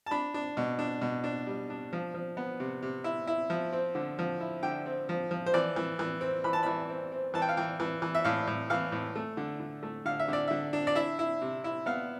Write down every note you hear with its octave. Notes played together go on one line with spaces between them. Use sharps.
A5
D4 B5
D4
B2
D4
B2
D4
G3
D4
F3
F3
B3
C3
C3
E4
E4
F3
C4
D3
F3
E4
D3 G5
C4
F3
F3
C5
E3 D5
E3
E3
C4
E3 B5
A5
E3 B5
C4
C4
E3 A5
G5
F5
E3 G5
E3
E3
E5
A2 F5
A2
E3 F5
A2
A3
D3
D3
A3
D3 F5
E5
D3 D5
D3 E5
D4
D5
E4 E5
E4
C3
E4
B3 F5